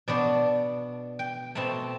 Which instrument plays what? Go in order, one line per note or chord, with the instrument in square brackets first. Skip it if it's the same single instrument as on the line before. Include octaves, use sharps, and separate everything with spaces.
[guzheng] B2 B3 D4 D5
G5
B2 A3 C4 A5